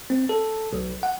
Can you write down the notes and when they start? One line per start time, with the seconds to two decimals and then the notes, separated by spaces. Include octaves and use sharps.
0.10 C4
0.29 A4
0.73 B1
1.03 F#5